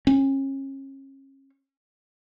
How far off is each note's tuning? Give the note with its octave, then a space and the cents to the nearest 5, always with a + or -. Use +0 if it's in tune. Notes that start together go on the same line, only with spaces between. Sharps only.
C#4 -35